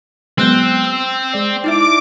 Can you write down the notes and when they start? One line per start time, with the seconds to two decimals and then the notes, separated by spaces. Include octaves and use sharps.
0.38 F#3 G#3 B3 C4 E6 F#6 G6
0.84 E6
1.32 G#3 D5 G6 C7
1.64 D#4 E4 E5 D6